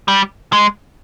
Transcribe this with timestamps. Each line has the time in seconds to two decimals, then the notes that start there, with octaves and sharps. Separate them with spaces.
0.08 G3
0.53 G#3